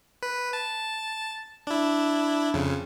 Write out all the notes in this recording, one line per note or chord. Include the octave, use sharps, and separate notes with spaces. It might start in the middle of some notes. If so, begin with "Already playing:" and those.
B4
A5
D4 E4
F2 C#3